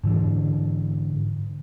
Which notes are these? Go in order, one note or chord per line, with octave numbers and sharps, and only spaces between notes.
G#2 D3 E3 D4